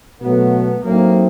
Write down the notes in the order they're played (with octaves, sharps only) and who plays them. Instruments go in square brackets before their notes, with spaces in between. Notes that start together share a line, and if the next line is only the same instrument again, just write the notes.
[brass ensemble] B2 F#3 A3 [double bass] B3
[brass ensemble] F#3 A3 C4 D#4 [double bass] A#3